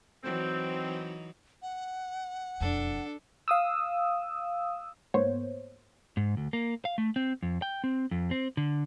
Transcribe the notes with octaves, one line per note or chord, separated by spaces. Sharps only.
E3 F#3 C4 D#4
F#5
E1 F2 D4 A4
F5 D#6 E6
G#2 A#3 B3 C5 C#5
G#2
D2
A#3
F5
A3
C4
F2
G5
C4
F2
C4
D3